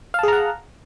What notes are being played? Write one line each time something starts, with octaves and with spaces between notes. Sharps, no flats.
G#4 F5 F#5 A5 A#5